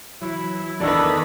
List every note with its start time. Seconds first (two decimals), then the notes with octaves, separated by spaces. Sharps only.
0.22 E3 F#3 E4
0.80 E2 D#3 E3 D4 A4 B4 D5 E6